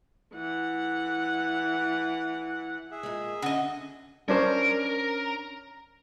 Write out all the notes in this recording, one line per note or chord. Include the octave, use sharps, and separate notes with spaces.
E3 F#5
G#4 E5
A#2 G#3
D3 C#4 F#4 D#5
C#4 D4 A#4 C5